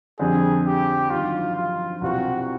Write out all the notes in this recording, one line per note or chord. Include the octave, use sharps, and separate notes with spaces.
F2 D3 G3 C4 G#4
G4
G2 D#3 F#3 F4
F4
C2 B2 G3 C4 F4 F#4